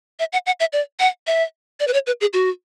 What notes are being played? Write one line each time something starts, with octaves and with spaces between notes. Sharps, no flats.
E5
F#5
F#5
E5
D5
F#5
E5
D5
B4
C#5
B4
G#4
F#4